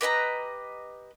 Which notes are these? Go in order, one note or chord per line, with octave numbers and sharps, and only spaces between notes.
G4 B4 D#5 A#5